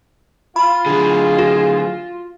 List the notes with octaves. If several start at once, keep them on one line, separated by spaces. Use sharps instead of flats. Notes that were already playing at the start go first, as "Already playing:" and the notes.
F4 B5
D3 F#3 G#4
F#4